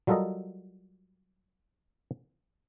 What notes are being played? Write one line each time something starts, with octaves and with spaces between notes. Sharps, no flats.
F#3 G3 F4 A4 A#4 D#5